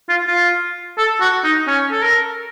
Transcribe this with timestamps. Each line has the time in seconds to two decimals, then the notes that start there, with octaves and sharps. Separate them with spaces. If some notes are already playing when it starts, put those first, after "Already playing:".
0.09 F4
0.27 F4
0.98 A4
1.21 F#4
1.44 D#4
1.67 C#4
1.92 A4
2.02 A#4